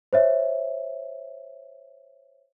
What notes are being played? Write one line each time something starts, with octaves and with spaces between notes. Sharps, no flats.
C5 C#5 E5